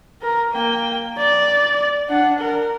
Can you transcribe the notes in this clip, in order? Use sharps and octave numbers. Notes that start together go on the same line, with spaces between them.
A#4
A#3 G5
D5
D4 F#5
A#4